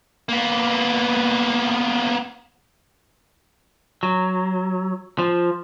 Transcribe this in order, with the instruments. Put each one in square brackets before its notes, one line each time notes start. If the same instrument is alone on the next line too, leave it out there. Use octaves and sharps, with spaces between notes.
[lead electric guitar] A#3 B3
F#3
F3